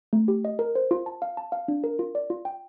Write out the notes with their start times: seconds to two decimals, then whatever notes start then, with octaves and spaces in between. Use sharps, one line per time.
0.13 A3
0.28 G4
0.45 D#5
0.59 A#4
0.75 C5
0.91 F4
1.06 A5
1.22 F5
1.37 A5
1.52 F5
1.68 D4
1.84 A#4
1.99 F4
2.15 D5
2.30 F4
2.45 G5